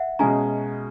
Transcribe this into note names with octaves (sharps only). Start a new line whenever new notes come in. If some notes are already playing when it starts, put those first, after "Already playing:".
Already playing: E5 F#5
B2 G#3 C#4 G#5 A#5